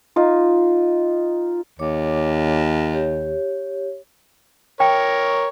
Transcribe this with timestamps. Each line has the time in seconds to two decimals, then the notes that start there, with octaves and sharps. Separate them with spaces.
0.16 D#4 F4
1.79 D#2 C#5 D6
2.93 G4 C#5
4.80 A#4 C#5 G5